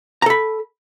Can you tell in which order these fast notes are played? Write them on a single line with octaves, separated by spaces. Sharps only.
A#5 A4 B5